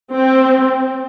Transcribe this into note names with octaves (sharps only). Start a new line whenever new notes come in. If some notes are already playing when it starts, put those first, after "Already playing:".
C4